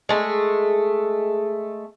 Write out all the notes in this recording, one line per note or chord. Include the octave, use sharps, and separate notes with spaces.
G#3 A3